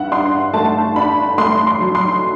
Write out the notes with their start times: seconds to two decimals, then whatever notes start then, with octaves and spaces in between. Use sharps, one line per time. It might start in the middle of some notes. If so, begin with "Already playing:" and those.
Already playing: G2 E5 F#5
0.12 D4 C6
0.54 A3 A5
0.96 D4 B5
1.38 A3 C6
1.67 C6
1.80 F#3
1.95 C6